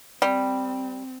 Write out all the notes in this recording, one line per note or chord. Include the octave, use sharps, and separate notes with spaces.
G3 C4